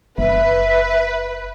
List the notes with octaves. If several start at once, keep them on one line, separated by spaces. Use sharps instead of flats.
F#1 B4 E5